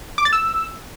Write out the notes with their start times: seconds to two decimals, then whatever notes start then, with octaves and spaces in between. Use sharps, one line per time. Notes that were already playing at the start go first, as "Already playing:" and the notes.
0.18 D6
0.25 A6
0.33 E6